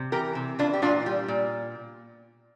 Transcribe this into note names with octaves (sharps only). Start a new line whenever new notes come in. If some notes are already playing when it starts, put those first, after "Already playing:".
Already playing: C3
E3 G4 A#4
C3
E3 D4 F4
G4
A#2 D4 F4
G3
A#2